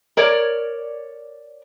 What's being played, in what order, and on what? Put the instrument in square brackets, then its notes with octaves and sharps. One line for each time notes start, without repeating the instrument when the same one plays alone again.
[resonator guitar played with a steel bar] A#4 C#5 D5